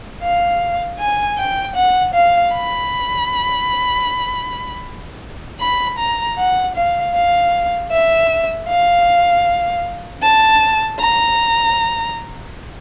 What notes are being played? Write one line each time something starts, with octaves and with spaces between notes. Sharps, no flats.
F5
G#5
G5
F#5
F5
B5
B5
A#5
F#5
F5
F5
E5
F5
A5
A#5